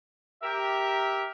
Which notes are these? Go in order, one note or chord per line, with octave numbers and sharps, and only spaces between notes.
G4 A#4 E5